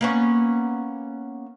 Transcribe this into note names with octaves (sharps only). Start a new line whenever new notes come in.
A#3 B3 C#4